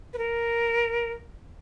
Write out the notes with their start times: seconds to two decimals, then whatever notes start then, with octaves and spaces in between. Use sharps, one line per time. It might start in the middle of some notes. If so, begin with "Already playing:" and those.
0.13 B4
0.18 A#4